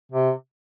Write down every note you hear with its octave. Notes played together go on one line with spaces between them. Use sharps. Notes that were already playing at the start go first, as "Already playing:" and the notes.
C3